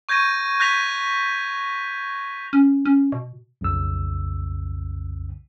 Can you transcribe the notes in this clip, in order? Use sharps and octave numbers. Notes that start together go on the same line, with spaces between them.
C#6 G6 G#6 A#6 D#7
F#6 G6 A#6 B6 F7
C#4
C#4
B2
B1 F2 C#3 E6